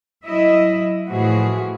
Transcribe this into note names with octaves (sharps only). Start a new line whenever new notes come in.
F#3 E4 D#5 E5
A2 E3 F3 E4 F#4 G#4